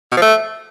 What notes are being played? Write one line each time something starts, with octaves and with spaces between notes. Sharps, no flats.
B2
F3
A3